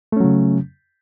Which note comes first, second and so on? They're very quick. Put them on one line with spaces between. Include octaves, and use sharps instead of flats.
A3 C#4 F#3 C#3